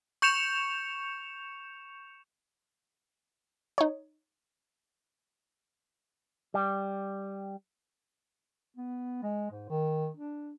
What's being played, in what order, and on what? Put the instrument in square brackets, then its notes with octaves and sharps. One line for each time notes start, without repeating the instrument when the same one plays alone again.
[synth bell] C#6 G6 C#7 E7 F7
[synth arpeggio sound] D#4 C#5
[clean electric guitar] G3
[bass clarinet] B3
G#3
G#2
D#3
D4